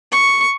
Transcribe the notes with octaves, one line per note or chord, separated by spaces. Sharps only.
C#6